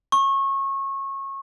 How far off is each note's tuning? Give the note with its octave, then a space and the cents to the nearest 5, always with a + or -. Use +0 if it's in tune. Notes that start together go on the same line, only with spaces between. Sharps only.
C#6 -25